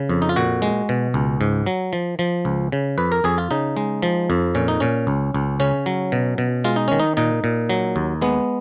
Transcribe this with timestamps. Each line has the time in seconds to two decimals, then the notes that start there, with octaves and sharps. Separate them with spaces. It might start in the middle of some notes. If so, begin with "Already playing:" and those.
Already playing: C#3
0.09 F2
0.22 D#4
0.29 F4
0.36 A#2 F#4
0.62 G#3
0.89 B2
1.14 C#2
1.41 G#2
1.66 F#3
1.93 F3
2.19 F3
2.45 C#2
2.72 C#3
2.98 F2 B4
3.12 A#4
3.24 F2 G#4
3.38 F4
3.51 C#3 D#4
3.77 G#3
4.02 F3
4.30 F2
4.55 A#2 C#4
4.68 D#4
4.80 A#2 C#4
5.07 C#2
5.34 C#2
5.60 C#3 C#4
5.86 F#3
6.12 B2
6.38 B2
6.64 G#3 F4
6.76 D#4
6.88 D#3 C#4
7.00 D#4
7.17 A#2 D#4
7.44 A#2
7.69 F#3
7.96 D#2
8.21 G#3 B3